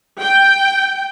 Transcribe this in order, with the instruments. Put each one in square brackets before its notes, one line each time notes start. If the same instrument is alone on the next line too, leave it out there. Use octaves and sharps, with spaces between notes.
[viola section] G5